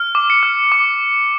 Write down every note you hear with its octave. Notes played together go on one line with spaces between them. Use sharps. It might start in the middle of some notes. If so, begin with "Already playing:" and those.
Already playing: F6
D6
C#7
F6
D6